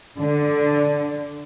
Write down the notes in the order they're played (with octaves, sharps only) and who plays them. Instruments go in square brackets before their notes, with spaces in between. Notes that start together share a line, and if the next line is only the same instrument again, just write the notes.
[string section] D3